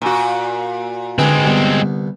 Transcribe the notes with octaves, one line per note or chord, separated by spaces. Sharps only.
A#2 F#4
D3 G#3 C4 D#4 G#4 B4
C2 B3